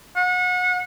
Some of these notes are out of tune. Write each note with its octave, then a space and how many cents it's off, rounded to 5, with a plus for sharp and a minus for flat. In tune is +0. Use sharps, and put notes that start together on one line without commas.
F#5 -30